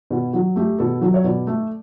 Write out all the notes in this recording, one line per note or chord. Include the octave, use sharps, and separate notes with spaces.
B2 F#4
F#3 F#4
A3 G4
B2 A4
F#3
C#5
B2 D5
A3